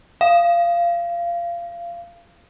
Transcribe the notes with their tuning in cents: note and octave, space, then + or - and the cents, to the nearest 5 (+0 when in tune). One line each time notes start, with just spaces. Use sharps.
F5 -20